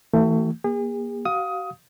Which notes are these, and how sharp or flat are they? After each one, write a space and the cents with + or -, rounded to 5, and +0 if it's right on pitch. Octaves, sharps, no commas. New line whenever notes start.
E3 -20 A3 +30 G4 -45
A#3 +30 G#4 -40
F#4 +40 F5 +10 D#6 +20